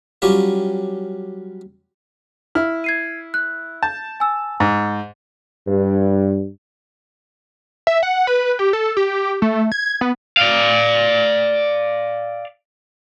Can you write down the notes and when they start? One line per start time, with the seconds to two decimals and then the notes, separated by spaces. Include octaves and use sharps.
0.22 F#3 G3 C#4 F4 G4 C#5
2.55 E4 F6
2.84 G#6 C7 D#7
3.34 F#6
3.83 A5 G6
4.20 G#5 E6
4.60 G#2
5.67 G2
7.87 E5
8.03 F#5
8.27 B4
8.59 G4
8.73 A4
8.97 G4
9.42 A3
9.72 G#6
10.01 B3
10.37 D5 F5